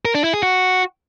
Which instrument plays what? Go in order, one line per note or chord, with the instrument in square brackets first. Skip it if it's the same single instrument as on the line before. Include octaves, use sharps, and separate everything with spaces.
[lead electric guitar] A#4
D4
E4
G#4
F#4